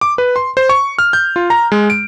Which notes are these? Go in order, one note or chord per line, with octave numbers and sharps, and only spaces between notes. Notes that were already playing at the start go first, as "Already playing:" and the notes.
D6
B4
C6
C5
C#6
F6
G6
F4
A#5
G#3
D7